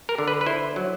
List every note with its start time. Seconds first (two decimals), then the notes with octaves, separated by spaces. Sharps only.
0.09 A#4
0.18 D3
0.28 B4
0.41 B4
0.46 E4 C5
0.76 F#3